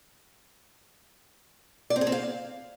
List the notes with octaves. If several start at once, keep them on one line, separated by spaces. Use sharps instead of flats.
D5
C4
G#4
C4
F5